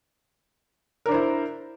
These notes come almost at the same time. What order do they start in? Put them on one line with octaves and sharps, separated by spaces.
A#4 D4 C5 E4